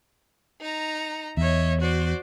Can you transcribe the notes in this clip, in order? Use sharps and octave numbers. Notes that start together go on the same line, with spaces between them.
D#4 A#5
E2 C#5 D#5 E5
F#4 C5 D5